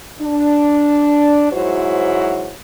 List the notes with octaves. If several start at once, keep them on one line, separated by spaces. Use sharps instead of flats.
D4
G#2 F#3 E4 F#4 C5 C#5